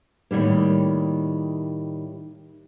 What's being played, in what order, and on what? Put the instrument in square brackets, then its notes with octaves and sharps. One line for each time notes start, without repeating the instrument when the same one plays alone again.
[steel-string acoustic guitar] A2 D#3 G3 A#3